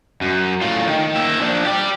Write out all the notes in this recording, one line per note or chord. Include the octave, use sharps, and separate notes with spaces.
F#2
A2 F4
D#3
A#3 E5
F3 D4
G4 D5